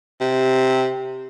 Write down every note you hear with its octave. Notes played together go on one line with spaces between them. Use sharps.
C3